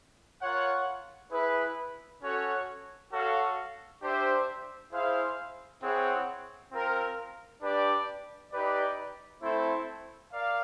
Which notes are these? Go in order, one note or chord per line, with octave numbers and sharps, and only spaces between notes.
F4 A#4 C#5 F#5
E4 G#4 B4
C#4 F#4 A4 C#5 F#5
F#4 A4 C#5 F5
D4 G4 C5 E5
E4 G#4 C5 F5
C4 E4 G#4 C#5 F#5
C4 F4 A#4
D4 G4 B4 D5
D#4 G4 B4 D5
A3 C4 E4 A4 C5
A#4 D5 F5